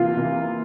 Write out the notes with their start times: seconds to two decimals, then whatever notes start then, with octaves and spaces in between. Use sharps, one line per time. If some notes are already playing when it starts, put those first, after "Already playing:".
Already playing: C3 E3 A#3 F4
0.16 C3 E3 A#3